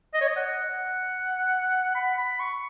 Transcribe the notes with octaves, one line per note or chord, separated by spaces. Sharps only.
D#5
C#5
D#5
F#5
B5
B5
C#6